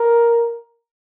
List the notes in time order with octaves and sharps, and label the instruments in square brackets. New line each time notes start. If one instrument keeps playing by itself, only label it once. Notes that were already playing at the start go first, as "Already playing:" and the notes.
Already playing: [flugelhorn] A#4